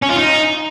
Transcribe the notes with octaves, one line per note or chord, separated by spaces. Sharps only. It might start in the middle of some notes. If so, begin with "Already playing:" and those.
C#4
F4
D#4